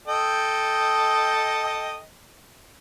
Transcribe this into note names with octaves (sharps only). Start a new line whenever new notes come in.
A4 D#5 G5